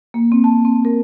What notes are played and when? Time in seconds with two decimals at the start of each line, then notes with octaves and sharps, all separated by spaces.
0.14 A#3
0.32 C4
0.44 A5
0.65 C4
0.85 A#4